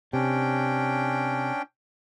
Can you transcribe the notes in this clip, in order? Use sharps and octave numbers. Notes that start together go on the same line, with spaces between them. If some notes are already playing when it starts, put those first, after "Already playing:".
C3 C#4 D4 G5